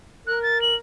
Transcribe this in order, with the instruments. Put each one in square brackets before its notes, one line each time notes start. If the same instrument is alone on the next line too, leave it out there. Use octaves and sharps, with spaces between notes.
[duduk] A#4 [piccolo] F#6
[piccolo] A6
F#7